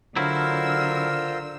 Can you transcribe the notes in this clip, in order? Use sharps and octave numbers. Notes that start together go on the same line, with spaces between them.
D3 F#3 E4 F4 A#4 C5 E6